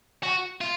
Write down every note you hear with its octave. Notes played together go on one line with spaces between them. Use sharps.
F#4
F4